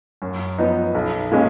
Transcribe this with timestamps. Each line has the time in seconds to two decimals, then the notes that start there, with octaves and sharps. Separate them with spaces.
0.22 F#2
0.58 F3 B3 D#4
0.95 B1
1.31 A#2 G#3 C#4